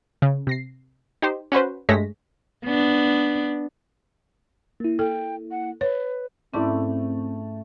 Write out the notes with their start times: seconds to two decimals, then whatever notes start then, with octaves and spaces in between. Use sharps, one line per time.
0.22 C#3
0.47 C3 A#6 C7
1.22 D#4 G4 C5
1.52 C#4 F#4 B4 C5
1.89 G2 G#3 A3 C#5 A#6 B6
2.65 B3 D4
4.80 A#3 E4
4.99 A4 G5
5.51 F#5
5.81 B4 C#5
6.54 G#2 A3 C4 C#4 E4 D5 D6